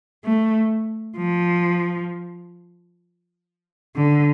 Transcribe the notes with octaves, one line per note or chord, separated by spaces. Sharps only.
A3
F3
D3